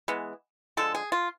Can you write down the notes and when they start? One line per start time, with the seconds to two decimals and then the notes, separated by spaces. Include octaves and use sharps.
0.08 E3 G#3 B3
0.77 D3 F3 G#3 A4
0.95 G#4
1.12 F4